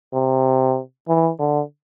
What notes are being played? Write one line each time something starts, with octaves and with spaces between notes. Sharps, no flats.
C3
E3
D3